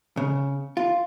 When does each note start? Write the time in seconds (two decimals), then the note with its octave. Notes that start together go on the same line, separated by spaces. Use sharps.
0.17 C#3
0.77 F4